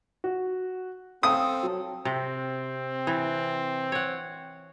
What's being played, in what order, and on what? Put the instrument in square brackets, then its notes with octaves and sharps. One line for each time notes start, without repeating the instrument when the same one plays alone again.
[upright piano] F#4
[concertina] C4 A4 [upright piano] F5 G5 [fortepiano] D#6
[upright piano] F#3
[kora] C3 [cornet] C4
[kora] E3
C#5 F#5